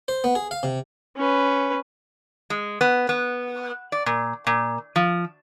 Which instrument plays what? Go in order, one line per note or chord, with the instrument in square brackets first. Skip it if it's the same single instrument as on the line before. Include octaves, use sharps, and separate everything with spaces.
[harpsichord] C5
B3
G#4
F5
C3
[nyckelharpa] C#4 B4
[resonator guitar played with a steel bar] G#3
B3
B3
D5
A#2
A#2
F3